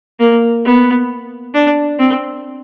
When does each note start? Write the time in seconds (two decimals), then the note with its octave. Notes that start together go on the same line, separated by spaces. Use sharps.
0.20 A#3
0.65 B3
1.54 D4
1.99 C4